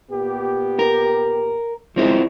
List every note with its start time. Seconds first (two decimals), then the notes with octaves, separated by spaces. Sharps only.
0.10 A#2 B3 G4
0.79 A#4
1.96 G#1 C#2 F3 G#3 C4 E4